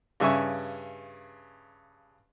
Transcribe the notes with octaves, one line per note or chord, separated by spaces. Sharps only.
G2 C#3 E5 G#5 C#6